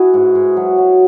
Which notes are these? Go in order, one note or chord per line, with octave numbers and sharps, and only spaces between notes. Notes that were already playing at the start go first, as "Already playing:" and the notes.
Already playing: E4 F#4 G#4
G#2
G#2
F#3
F#3